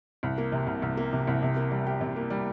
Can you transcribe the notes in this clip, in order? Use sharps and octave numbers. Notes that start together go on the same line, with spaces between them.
C2
A#3
C3
C2
C2
A#3
C3
C2
C3
A#3
G3
G4
C3
A#3
G3